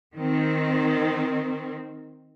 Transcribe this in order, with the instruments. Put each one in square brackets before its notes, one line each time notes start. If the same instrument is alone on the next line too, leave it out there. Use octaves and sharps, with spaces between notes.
[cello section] D#3 C4